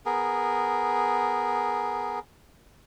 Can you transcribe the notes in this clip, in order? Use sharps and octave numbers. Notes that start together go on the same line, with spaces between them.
B3 G#4 A#4